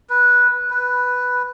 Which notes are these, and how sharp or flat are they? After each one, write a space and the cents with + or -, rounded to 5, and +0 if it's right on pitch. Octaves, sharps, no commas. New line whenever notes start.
B4 -10
B4 +0